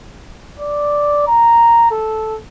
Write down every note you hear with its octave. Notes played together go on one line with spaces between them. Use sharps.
D5
A#5
A4